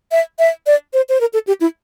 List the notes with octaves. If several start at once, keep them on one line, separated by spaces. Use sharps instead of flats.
E5
E5
D5
C5
C5
A#4
A4
G4
E4